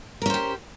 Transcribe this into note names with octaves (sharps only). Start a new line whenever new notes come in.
C#4 G4 A#4 C5